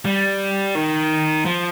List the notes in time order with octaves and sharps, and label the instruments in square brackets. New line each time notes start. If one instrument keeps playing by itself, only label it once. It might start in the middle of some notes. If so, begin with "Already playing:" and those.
[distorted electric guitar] G3
D#3
F3